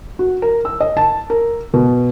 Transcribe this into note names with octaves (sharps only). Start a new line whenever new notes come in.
F#4
A#4
E6
D#5
A5
A#4
B2